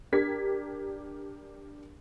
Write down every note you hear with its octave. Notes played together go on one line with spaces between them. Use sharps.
D4 G4 A#4 G#6 B6